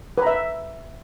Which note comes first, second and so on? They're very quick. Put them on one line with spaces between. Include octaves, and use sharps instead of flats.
B4 A#5 E5